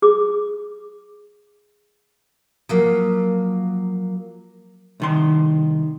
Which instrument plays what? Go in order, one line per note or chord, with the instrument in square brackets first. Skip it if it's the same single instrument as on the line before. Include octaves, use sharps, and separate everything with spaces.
[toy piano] G#4 D6
[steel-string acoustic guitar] F3 F#3 A#3
[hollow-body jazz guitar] C2 D#3 C6